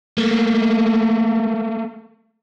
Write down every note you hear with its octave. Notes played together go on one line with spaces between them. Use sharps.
A3 A#3